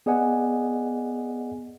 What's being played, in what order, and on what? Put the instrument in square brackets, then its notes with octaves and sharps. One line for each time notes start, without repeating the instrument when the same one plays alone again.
[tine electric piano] B3 G#4 D5 D#5 F#5 G#5